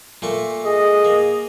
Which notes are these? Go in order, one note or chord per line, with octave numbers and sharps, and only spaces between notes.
A#2 A3 C#6
G#4 D#5
A#3